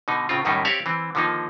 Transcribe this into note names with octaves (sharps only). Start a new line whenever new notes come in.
B2 D3 D#4
A2 C#3 C4 F4
F#2 A2 D#3 G3 D#4 E4
C4 G4 C#5 D5 E5 F5
E3 C4
D3 D#3 F3 A#3 D#4